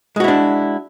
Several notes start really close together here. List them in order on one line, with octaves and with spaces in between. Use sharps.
G#3 F#4 E4 D4